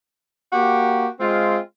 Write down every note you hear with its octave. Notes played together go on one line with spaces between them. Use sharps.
A#3 F#4 G4
G#3 C4 F4